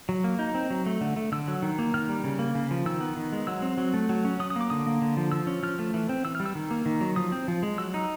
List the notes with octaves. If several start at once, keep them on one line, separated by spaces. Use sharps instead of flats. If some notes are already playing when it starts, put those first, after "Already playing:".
F#3
A#3
D#4
C4
F#3
A3
D3
A3
D3 E6
F#3
D#3
A#3
D#3 F6
G3
C#3
A#3
C#3
F3
D#3 E6
B3
D#3
G#3
F#3 E6
C4
F#3
A3
F#3
C#4
F#3 D#6
D#6
A#3 D6
D3 D#6
A#3
D3
F3
F3 E6
C#4
F3 F6
A3
E3
C4
E3 E6
F6
G3
E6
D#3
A#3
D#3
F#3
F3 D#6
C4
F3
G#3
F#3 E6
D#4